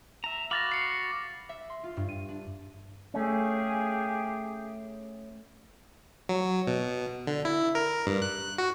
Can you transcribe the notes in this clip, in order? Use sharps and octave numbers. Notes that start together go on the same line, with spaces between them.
E5 A#5
F#4 F5 B5 D6 A6 A#6
C7 C#7
E5
C6
F4
G2
D#7
D4
A3 C#4 G4 G#4 F5
F#3
B2
D3
E4
A#4
G2
F#6
F#4